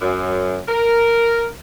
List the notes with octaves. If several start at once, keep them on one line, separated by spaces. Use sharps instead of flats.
F#2
A#4